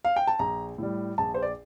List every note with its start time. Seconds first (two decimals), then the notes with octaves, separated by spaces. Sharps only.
0.05 F5
0.16 G5
0.27 A5
0.39 A#1 A#5
0.78 A2 G3
1.18 A#1 A5
1.34 C5
1.43 D5